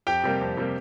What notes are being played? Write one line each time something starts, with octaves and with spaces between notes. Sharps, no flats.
F2 G4 G5
C3 G3 A#3
F2
C3 G3 A#3